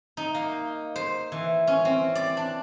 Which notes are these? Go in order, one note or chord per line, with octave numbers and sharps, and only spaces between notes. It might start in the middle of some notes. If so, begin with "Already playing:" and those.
D#4
A#3
C5
E3
C#4
C4
D5
D4